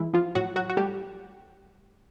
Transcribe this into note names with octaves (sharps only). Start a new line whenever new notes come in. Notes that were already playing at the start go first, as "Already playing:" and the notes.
Already playing: E3 G#3 E4
F3 F4
A2 F#3 F#4
F#3 F#4
F#4
G3 A3 G4